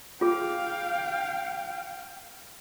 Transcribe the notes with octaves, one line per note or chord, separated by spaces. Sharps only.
F4 G#4 F5 G5